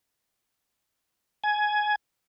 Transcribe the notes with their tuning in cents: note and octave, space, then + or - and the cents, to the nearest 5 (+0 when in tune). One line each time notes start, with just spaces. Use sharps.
G#5 +15